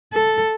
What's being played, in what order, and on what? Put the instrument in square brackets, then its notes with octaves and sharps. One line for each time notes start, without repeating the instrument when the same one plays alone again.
[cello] A4